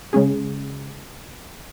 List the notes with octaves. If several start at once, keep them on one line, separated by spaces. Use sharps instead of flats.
C#3 G#3 C#4 G#4